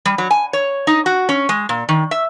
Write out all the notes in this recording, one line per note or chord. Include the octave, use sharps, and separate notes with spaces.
G3
F#3
G#5
C#5
D#4
F#4
C#4
G#3
A#2
D#3
E5